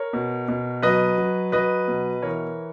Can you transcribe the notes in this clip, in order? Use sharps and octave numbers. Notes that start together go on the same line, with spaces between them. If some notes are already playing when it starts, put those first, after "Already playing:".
Already playing: A#4 C#5
B2
B2
F#3 B4 D#5
F#3
F#3 B4 D#5
B2
E3 A#4 C#5